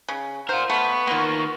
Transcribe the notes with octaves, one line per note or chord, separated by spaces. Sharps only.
C#3
F4 A#4 C5 F#5
A3 B3 F5 C#6
D#3 A#3 B3 F4